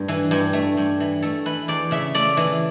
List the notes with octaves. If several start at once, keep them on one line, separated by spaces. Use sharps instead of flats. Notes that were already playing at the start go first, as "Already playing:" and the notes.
Already playing: G2 A3
E3
G2
A3
G2
E3
A3 A4
E3 B4
E2 D5
C#3 E5
A3 D5
E3